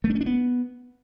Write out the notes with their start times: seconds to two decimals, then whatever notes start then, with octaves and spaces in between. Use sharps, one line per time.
0.04 A3
0.10 D4
0.15 C#4
0.21 D4
0.26 B3